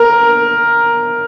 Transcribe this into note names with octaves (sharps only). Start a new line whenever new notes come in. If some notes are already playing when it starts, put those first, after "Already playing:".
Already playing: A#4